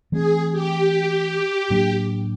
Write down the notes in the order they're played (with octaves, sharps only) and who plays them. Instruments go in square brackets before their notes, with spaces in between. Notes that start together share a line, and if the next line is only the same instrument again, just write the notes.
[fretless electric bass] E3 A3 C4 [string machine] G#4
[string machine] G4
[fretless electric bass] A2 F#3 A#3 D4